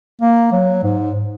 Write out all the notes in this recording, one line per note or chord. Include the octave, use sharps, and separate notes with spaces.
A#3
F#3
G#2